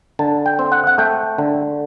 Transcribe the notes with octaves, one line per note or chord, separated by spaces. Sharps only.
D3 A5
G5
C4
F#5
F#5
A3 G5
D3